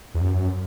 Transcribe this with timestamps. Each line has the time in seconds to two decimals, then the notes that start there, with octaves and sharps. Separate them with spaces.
0.14 E2
0.21 F#2